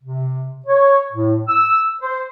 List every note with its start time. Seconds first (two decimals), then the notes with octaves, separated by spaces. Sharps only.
0.04 C3
0.66 C#5
1.12 A2
1.48 E6
2.01 C5